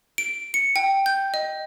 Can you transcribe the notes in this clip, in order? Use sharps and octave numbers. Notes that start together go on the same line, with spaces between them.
D7
C#7
G5
G6
D#5